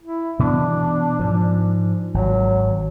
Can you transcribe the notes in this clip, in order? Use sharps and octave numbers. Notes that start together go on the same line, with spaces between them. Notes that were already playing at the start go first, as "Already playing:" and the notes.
E4
B2 E3 B3 D4
G#2 F3
G#1 F#3